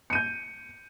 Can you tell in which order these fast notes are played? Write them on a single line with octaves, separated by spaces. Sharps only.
C#7 D#7 G6